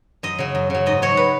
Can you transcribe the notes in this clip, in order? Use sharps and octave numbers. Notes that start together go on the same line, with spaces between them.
F#2 D#5
C#3 F#3
F#2
C#3 F#3
G#2 D#5
F#3 C#5
B4